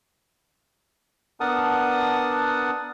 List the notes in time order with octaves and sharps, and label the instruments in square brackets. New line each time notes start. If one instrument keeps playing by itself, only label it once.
[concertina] B3 D4 A#4 F#5 A5 D#6